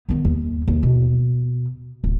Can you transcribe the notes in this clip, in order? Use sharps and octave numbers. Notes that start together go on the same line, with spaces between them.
D#3 B3
D#2
D#2
B2
D1